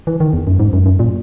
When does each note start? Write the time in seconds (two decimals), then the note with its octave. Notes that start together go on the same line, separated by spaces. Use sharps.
0.07 E3
0.20 D#3
0.33 E2
0.47 F#2
0.60 G#2
0.73 F#2
0.86 F#2
0.99 A#2